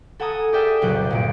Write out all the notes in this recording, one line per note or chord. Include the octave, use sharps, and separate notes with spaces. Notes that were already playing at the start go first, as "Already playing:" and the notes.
A4 F#5 G#5 A#5 D#6
G4 G#4 A#4 D5 E5 G5
F#1 C2 A#2 F#3 F#6 G6
G1 A#2 D7